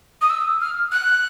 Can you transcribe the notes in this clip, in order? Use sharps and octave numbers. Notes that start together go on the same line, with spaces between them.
D#6
E6
F6
F#6